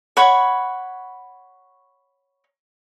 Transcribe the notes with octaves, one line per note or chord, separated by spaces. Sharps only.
C#5 F#5 B5 C#6